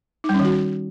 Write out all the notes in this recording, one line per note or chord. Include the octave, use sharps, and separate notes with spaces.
D#4
G3
C#4
D#3
F#4